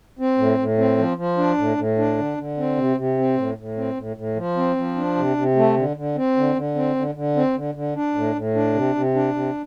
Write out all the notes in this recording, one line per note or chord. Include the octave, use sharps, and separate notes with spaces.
C4
A2
A2
C4
F3
F3
D4
A2
A2
D4
D3
D3
C4
C3
C3
C4
A2
A2
C4
A2
A2
F3
C4
F3
D4
C3
C3
A3
D3
D3
C4
D3
D3
C4
D3
D3
C4
D3
D3
D4
A2
A2
D4
C3
C3
D4
C3